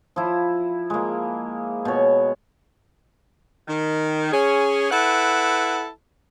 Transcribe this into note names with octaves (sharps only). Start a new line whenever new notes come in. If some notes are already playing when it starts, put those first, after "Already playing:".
F3 E4
G#3 A#3
B2 C#5
D#3
C#4 G#4
E4 A4 B4 F#5